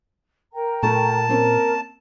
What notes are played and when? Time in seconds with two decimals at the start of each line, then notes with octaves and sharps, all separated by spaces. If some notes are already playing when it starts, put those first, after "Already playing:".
0.54 A#4 G5 A#5
0.83 A#2 A3 A5
1.29 A#3 C4 C#4 A#4